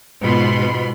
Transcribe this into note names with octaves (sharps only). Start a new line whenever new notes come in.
G#2 B2 F4 B5 C6